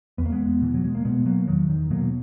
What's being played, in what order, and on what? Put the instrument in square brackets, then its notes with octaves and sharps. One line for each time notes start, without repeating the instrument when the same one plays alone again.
[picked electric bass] E2 B3
A#3
G#3 B3
B2 E3
F#3
G#3
A#3
B2 G#3 B3
F#3 A#3
E2 D#3 F#3
D#3
B2 F#3 A#3